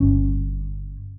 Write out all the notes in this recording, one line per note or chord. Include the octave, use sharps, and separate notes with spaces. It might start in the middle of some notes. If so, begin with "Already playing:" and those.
G1 C#4